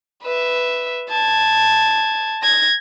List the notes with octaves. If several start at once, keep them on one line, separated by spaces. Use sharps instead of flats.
B4 E5
A5 G#6
G#6 A#6